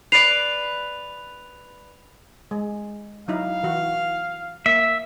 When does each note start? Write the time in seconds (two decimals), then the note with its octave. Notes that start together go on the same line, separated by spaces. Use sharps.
0.12 B4 D5 C7 F7
2.51 G#3
3.28 F#3 D#4 E4 F5
3.63 E3 F#4
4.66 A#3 E5